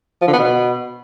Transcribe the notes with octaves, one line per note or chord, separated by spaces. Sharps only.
F3
D3
B3
B2